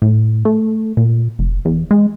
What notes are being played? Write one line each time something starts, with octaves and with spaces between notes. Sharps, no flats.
A2
A3
A#2
F1
E2
G#3